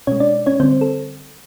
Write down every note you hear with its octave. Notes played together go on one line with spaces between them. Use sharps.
B2 G#3 C#4 C#5
D4 D5
C#4 C#5
D3 G3 C4 C5
A4